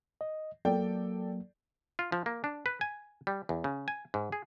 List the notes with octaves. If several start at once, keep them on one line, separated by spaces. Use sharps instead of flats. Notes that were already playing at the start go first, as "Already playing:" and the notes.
D#5
F#3 A#3 A4 D5 G5
F4
F3
A#3
D4
B4
G#5
G3
E2
C#3
G#5
G#2
G#4